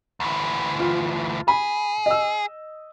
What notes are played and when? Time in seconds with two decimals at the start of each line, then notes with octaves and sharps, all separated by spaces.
0.20 D2 E3
0.80 F4
1.48 G#4 B5
2.06 D#5 E6